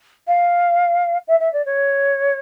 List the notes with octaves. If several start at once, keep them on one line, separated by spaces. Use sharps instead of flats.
F5
E5
E5
D5
C#5